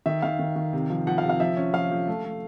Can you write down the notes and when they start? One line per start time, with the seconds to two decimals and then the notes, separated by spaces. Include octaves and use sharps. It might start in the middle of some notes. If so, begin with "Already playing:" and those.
0.06 D#3 E5
0.22 D#3 F5
0.39 D#3
0.56 D#3
0.73 C3
0.90 F3
1.07 F3 F#5
1.18 F5
1.23 C3
1.29 F5
1.40 F3 E5
1.57 C#4
1.73 F3 F5
1.91 F3
2.08 A3
2.24 A3